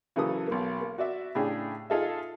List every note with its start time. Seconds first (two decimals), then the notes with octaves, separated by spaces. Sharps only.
0.16 C#3 E3 F#3 A#3 A4 D#6
0.48 B1 A#3
0.81 A#3
0.98 F#4 D5 E5
1.35 A2 C#3 D4 G4 G#4
1.90 D#4 F4 G#4 A4 D#5 E5